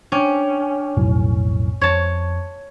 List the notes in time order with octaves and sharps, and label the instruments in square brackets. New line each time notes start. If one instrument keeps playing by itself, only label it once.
[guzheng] C#4 [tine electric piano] D4 G5 D6
[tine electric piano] B1 F2 A2
[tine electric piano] F2 [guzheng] C#5 A5